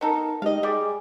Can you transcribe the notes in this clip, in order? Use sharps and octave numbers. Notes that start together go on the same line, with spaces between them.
B3 D#4 A4 A#4
G#3 D#4 G4 D#5 F5
G3 G#4 D#5 D6